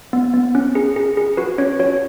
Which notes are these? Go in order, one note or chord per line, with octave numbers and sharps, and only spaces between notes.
B3
B3
C#4
G#4
G#4
G#4
F#4 B4
C#4 C#5
F#4 C#5